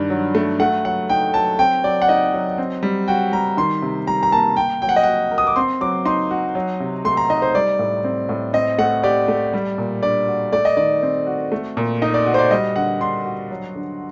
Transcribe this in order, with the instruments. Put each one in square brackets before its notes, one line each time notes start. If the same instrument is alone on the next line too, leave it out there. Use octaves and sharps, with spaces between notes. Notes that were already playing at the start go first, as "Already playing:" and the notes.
Already playing: [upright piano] G2 D#3 [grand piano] D5
[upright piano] F#3
A3
[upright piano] A3 [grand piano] F#5
[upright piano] F#3 [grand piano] F#5
[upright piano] D#4 [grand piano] G5
[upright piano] F#3 [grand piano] A5
[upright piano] C4 [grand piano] G5
[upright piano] F#3 [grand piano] D5
[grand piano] F#5
[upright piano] D#4 [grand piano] D#5
[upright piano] F#3
C4
G3
[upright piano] F#4 [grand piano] G5
[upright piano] G3 [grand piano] A#5
[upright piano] D#3 [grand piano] C6
[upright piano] C3
[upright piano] G3 [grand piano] A#5
[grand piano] A#5
[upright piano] A#3 [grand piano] A5
[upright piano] A#3 [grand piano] G5
[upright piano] F#3 [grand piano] G5
[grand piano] F#5
D#5
[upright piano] F#4 [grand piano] F#5
[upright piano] A#4
[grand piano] D#6
D6
[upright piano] C4 [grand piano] C6
[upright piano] F#3 [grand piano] D6
[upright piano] D#4 [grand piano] C6
[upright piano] F#4
F#3
C3
[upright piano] A3 [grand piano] C6
[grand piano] A#5
[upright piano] D#4 [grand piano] D#5
[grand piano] C5
[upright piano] G3 [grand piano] D5
[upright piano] A2
C4
A2
[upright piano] C4 [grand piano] D#5
[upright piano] A3 [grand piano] F#5
[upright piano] G4 [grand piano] D5
[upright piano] A3
G3
A#2
[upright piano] D4 [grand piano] D5
[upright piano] F#4
[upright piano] A3 [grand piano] D5
[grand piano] D#5
[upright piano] D#3 [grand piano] D5
[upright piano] C4
F#4
A3
A#2
[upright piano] D#4 [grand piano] D#5
[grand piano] D5
[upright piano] F#4
[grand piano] C5
D5
[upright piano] G3 [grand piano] D#5
[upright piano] D3 [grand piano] F#5
[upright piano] D4 [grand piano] C6
[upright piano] F#4
F#3
D3